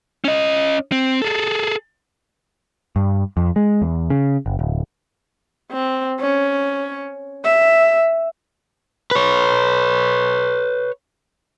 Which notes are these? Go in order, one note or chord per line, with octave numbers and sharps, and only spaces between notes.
C#4 D#5
C4
G#4 A4
G2
F2
G#3
E2
C#3
F#1
D1
C4
C#4
E5
B4 C#5